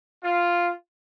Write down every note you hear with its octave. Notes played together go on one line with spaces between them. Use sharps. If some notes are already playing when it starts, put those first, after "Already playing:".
F4